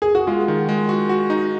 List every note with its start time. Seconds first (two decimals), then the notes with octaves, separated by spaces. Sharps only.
0.02 G#4
0.15 F#4
0.27 G#3 F4
0.48 D#3
0.69 G#3
0.89 F#4
1.09 F#4
1.30 D#4